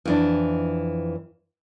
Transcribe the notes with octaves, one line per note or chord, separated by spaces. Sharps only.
F2 E3 D4